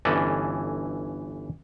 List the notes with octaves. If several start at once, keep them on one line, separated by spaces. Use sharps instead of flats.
G1 E3 C#4 A4 D5 D#5